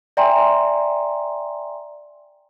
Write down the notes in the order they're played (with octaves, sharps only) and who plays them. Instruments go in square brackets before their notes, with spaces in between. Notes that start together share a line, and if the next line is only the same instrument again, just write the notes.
[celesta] D5 E5 G5 G#5 A#5 C6